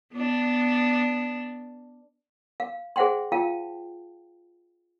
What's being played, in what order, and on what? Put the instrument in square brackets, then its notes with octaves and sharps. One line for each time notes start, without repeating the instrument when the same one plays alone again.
[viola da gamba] B3 D4
[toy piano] F5
G#4 C5 E5 F#5 G5 C6
F4 F5 G5 A5